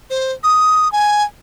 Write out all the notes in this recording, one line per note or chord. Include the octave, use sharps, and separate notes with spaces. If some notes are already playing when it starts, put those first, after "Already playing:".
C5
D#6
G#5